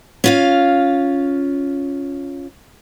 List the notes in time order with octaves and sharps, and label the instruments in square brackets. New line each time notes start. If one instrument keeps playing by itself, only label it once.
[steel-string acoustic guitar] C#4 F4 F5